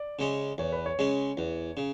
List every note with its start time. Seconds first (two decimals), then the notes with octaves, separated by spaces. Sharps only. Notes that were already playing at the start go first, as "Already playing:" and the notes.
Already playing: D5
0.19 C#3 G#3 C#4
0.58 E2 C#5
0.72 B4
0.86 C#5
0.99 C#3 G#3 C#4
1.37 E2
1.77 C#3